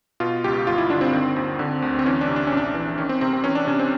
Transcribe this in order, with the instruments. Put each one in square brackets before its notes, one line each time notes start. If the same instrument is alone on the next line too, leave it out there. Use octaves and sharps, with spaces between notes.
[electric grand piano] B2 F4
C#2 G4
G1 F4
E4
D3 D4
C4
D#3
D#2
D3
D2
C4
E3 C#4
D4
C3
D4
A#1 C#4
D4
E3
D#3 C#4
C4
C3 C4
C4
E3 C#4
D4
C3 C#4
C4